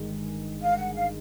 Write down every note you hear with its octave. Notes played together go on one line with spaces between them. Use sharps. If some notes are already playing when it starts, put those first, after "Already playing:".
Already playing: G1 G2 D#3 G#3
F5
F#5
F5